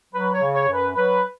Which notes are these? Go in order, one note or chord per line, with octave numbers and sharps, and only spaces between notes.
F#3 B4
C#5
C#3
C#5
F#2
B4
F#3 B4